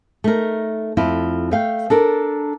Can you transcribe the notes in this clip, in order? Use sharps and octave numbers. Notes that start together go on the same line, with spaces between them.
A3 D#4 A#4
F2 E4 F4
A3 F5 G5
D4 A4 A#4